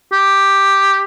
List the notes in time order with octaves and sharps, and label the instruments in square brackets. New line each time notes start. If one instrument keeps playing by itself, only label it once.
[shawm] G4